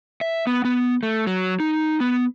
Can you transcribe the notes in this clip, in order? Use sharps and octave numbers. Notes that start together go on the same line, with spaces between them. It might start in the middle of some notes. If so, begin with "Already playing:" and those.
E5
B3
B3
A3
F#3
D#4
B3